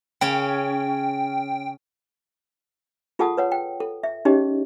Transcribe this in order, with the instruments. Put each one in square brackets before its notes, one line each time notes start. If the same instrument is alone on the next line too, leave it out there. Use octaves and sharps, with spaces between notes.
[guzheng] C#3 C#4 [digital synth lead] G5
[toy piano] F4 G#4 A4 F#5 A5 D#6
B4 C#5 F#5
G5
A4
E5
C#4 D#4 G4 G#4 C#5 D#5